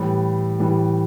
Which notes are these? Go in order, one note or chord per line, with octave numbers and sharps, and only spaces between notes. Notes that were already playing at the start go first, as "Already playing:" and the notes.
Already playing: A2 E3 G3
A2 E3 G3